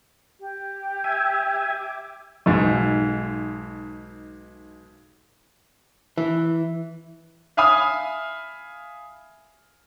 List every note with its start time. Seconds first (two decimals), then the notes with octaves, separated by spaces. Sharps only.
0.40 G4
1.04 E5 G#5
1.78 D6
2.46 B1 G#2
6.17 E3
7.57 E5 F5 G#5 B5 D#6 F6